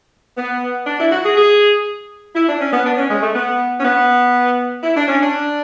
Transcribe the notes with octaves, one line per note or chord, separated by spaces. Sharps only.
B3
D4
E4
F#4
G#4
G#4
E4
D4
C#4
B3
D4
C#4
G#3
A3
B3
C#4
B3
E4
D4
C#4
D4